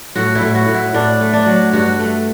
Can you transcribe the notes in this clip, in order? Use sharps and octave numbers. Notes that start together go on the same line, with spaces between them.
A2 F#4
E4
A2
F#4
A2
E4
A2 D4
A3
D4
F#3
G2 F#4
A3